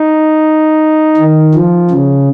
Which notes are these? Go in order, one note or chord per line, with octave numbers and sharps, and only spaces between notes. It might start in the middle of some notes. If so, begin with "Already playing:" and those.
Already playing: D#4
D#3
F3
C#3